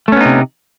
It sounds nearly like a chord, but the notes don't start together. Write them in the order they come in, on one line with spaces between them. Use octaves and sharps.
A3 C#4 B3 D#4 C3